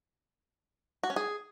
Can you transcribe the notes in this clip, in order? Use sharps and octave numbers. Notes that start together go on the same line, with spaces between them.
F#4
C#4
G#4